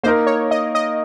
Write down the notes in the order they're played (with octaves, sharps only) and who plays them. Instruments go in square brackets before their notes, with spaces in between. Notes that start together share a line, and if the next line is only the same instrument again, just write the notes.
[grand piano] A#3 D#4 A#4 [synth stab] C5
[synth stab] C#5
D#5
D#5